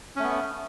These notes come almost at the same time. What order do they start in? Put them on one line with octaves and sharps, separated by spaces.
C#4 A3 B3